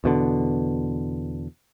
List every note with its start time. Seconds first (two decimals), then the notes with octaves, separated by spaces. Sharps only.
0.04 E2 B2 D3